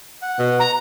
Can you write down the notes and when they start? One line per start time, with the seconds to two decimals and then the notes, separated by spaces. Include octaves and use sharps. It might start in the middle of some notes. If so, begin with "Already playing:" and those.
0.22 F#5
0.39 B2
0.60 A#5